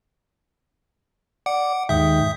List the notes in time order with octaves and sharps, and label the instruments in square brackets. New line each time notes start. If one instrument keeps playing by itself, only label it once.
[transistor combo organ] D5 D6 [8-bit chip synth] F#5
[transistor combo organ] D#2 G#2 G5 [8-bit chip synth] E5 D#6